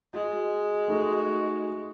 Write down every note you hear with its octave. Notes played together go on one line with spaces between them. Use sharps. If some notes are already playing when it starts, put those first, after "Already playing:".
G#3 F#4
A3 D#4 F#4